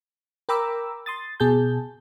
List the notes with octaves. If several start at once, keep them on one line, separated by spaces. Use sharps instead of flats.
A#4 G5 A#5 B5 D6 E6
C6 D#6 A6
B2 G#4 A5 G6